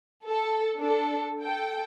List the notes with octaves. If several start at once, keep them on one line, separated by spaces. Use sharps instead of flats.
A4
D4 A4
A4 G5